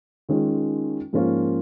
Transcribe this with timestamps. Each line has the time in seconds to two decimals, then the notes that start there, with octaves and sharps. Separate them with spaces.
0.29 D#3 G#3 C#4 F4
1.13 G#2 F3 A#3 C#4 F4